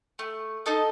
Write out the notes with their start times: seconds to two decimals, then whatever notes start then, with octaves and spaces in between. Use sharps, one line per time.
0.19 A3
0.66 D#4 A4 D#5